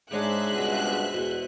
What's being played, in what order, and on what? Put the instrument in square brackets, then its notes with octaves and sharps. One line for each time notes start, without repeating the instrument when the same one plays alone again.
[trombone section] G#2 [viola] G#3 [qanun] D4 C#5 F#5 [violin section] C5 E5 F#6
[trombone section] C#2 G2 B2
[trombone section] E2 [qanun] B2